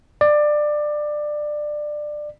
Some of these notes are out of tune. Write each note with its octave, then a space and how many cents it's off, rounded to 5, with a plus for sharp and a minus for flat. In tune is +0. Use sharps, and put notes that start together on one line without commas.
D5 +20